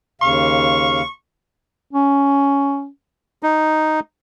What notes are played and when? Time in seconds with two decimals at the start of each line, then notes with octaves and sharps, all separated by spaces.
0.21 D#2 C#3 F5 C#6
1.93 C#4
3.43 D#4